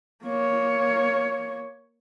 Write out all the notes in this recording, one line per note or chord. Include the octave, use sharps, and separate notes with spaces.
A#3 C#5